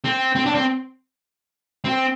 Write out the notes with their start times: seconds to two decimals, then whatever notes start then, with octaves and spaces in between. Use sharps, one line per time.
0.05 C4
0.35 C4
0.46 D4
0.54 C4
1.85 C4